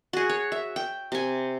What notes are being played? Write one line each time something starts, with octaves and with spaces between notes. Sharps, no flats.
F#4 G#4
C#5
E5
G5
C3 G#5